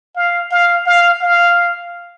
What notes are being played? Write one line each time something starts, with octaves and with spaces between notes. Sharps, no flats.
F5
F5
F5
F5